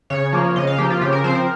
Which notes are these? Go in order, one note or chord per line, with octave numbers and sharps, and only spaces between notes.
C#3 C#5
F3 A#3
C#3 D#5
F5
F3 A#3 G4
F4
C#3 G4
A#4
F3 C4 C5
A#4